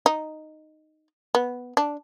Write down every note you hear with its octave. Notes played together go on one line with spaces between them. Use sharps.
D#4
B3
D4